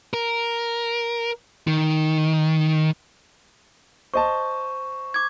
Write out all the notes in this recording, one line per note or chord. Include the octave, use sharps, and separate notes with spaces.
A#4
D#3
C5 D#5 A5 C#6
D6 G#6